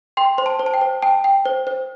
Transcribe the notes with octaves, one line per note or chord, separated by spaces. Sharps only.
G5 C6
C5 C6
A5
C5
A5
G5
C5
G5 A5
G5
C5
C5